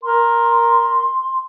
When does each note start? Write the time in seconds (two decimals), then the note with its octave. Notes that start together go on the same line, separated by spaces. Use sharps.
0.03 A#4 C6